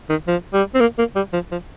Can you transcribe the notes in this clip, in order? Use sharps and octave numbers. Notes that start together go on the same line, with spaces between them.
D#3
F3
G3
C4
A#3
A#3
G3
F3
F3